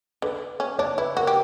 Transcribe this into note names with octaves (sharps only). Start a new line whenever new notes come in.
D3 B4
C#4
D4 C#5
E4 B4
F#4 A#4
G4